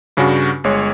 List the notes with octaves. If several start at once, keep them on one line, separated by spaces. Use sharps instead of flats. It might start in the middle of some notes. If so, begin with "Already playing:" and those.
G2 C#3 C#4 D4 F#4
G1 G#3 C#5